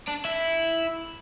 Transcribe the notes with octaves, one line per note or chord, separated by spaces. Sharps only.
D4
E4